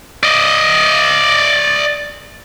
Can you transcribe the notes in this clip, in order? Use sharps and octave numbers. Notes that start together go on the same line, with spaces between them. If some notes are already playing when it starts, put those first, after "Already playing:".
D5 D#5